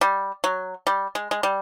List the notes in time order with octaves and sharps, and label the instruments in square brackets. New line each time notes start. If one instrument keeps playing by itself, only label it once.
[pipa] G3
F#3
G3
G#3
G#3
G3